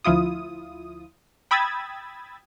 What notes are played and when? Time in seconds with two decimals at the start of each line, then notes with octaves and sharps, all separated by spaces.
0.05 D2 F3 E4 F4 D#6
1.51 G5 B5 D#6 E6 G#6 A6